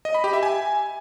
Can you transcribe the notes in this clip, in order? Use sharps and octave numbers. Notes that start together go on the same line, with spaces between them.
D#5
B5
G4
E5
G#5